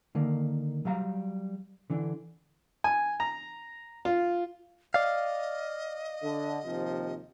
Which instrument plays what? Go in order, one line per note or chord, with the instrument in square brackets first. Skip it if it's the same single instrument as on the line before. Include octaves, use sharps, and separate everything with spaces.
[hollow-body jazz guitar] D3 D#3 A#3
F#3 G3 F5 A#5
D3 E3 D4
[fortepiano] G#5
A#5
F4
[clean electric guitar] D5 F5 [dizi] D#5
[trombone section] D3
D#2 C3 F3